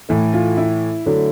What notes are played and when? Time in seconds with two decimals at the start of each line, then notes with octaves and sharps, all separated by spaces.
0.09 A2 E3 A3
0.33 F4
0.57 E4
1.06 D3 F#3 A3